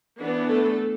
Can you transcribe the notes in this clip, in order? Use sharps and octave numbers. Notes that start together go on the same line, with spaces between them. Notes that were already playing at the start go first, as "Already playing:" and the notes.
E3 B3 D4
A3 A4